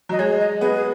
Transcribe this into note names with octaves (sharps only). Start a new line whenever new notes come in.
F#3 D#5
G#3 C#5
D#5
B3 G#4
G#4